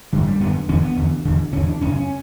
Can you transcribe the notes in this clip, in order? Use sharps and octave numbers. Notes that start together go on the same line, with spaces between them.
F#2 D3 G3
G3
F#2 D3 B3
E2 D3 C#4
B3
E2 D3
E2 D3
E2 D3 C#4
D4
F#2 C#3 C#4
C#4